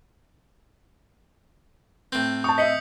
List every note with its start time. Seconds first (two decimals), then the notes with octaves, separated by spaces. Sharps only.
2.12 A2 C4 G6
2.44 A5 C#6 D#6
2.58 D#5 E5 B6 C#7 F#7